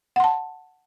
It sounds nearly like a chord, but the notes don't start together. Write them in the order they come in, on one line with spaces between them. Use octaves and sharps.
F#5 C6 A5